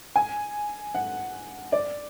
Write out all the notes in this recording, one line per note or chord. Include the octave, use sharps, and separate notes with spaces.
G#5
F#5
D5